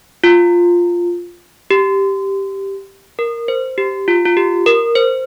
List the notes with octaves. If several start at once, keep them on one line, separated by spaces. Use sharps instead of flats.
F4
G4
A#4
C5
G4
F4
F4
G4
A#4
C5